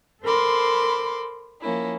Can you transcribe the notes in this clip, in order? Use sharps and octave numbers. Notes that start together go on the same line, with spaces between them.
A4 A#4 C5 B5 C6 D6
F3 A#3 C#4 E4